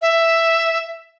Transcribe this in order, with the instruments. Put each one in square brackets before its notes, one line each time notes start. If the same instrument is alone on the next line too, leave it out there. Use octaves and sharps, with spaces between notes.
[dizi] E5